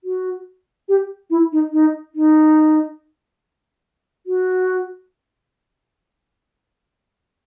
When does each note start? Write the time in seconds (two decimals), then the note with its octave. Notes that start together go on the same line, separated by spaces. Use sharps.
0.04 F#4
0.89 G4
1.30 E4
1.52 D#4
1.73 D#4
2.15 D#4
4.27 F#4